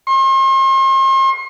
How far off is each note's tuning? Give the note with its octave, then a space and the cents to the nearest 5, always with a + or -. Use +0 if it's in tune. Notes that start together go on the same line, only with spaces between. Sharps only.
C6 +40